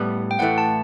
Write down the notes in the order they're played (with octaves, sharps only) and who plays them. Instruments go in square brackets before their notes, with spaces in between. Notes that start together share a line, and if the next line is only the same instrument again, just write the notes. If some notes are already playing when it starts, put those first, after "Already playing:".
Already playing: [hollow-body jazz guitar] A2 G3 B3
[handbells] G5
[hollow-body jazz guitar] A2 E3 A3 [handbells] F#5
[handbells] A5